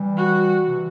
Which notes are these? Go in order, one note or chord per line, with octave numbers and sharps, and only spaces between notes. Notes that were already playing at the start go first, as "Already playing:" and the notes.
Already playing: E3 G3
F#4
C3 E3